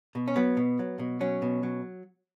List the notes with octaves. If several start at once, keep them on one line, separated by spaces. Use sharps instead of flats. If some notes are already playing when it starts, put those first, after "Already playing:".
B2
C#4
F#3 B3
B2
F#3
B2
F#3 C#4
B2
F#3